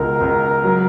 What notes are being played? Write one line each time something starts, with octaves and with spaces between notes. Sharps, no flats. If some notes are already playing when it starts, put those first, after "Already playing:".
Already playing: C#2 B2 A#4
C#2
F#3